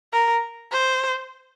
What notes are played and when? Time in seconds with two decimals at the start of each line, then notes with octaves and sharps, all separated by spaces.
0.13 A#4
0.72 C5